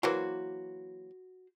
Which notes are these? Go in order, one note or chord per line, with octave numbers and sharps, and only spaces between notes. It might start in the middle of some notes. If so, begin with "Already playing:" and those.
E3 F#3 A#3 F#4 C5